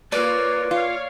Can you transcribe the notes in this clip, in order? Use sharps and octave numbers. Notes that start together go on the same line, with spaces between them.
A#3 F4 B4 C#5 D5
F4 C#5 F5